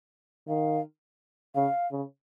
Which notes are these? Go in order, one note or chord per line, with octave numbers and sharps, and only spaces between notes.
D#3 F5
C#3 F5
C#3